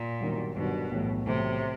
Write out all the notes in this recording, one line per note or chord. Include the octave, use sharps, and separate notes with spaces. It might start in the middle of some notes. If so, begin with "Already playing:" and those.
Already playing: A#2
G1 G2 D#3 F#3
G1 G2 B2 D#3 F#3
B1 A2 E3 A3
B1 A2 C3 E3 A3